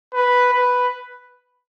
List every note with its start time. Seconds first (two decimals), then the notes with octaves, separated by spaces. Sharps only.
0.14 B4
0.53 B4